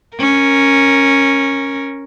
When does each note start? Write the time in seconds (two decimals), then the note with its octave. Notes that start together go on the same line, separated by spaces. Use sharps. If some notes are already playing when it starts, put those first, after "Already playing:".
0.17 C#4 A#4